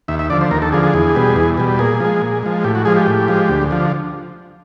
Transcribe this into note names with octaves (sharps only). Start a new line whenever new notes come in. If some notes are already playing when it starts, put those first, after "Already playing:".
D#2 E5
E5
D3 F3 D5
C5
D#2 A#4
A4
D3 F3 G#4
G#4
E2
B2 G3
E2
B2 G3
A#2 G#4
F3 G#3
A#2
F3 G#3
A2 G4
F#4
F3 G#3 G#4
G4
A2
F3 G#3
D2
D3 F3